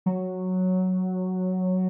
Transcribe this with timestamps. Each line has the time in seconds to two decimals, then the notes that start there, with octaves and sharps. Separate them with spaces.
0.06 F#3